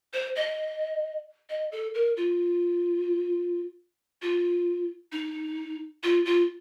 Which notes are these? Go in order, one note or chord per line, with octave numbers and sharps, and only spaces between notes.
C5
D#5
D#5
A4
A#4
F4
F4
D#4
F4
F4